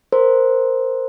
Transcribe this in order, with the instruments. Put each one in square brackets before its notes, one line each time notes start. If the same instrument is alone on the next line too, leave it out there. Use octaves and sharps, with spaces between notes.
[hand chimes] A#4 C5